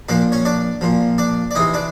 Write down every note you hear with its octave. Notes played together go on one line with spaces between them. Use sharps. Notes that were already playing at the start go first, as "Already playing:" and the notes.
A#2 F3 D4 D5
C#4 C#5
D4 D5
A#2 F3
D4 D5
D5
C3 E3 D#4 D#5
D4 D5